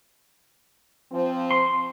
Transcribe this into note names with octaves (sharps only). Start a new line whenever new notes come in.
F3 C4
C6